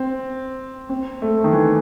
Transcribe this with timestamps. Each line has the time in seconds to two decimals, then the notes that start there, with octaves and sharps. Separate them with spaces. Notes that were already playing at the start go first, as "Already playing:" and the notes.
Already playing: C4
0.89 C4
1.22 A3
1.44 D#3
1.53 E3